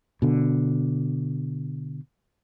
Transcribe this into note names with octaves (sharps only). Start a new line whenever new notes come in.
B2 D3